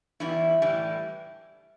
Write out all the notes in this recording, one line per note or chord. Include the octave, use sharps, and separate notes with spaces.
E2 E3 G3 E4
A2 E3 G3